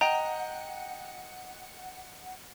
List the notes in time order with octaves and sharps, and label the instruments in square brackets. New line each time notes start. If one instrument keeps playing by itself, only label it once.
[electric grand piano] D#5 G5 D7 [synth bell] F#5 [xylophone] A#5